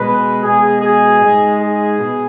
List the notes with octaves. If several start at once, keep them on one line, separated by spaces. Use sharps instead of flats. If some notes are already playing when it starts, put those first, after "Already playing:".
Already playing: B2 G#3 B4
B2 G#3 G#4
G#4
G#2 G#3
G#4
B2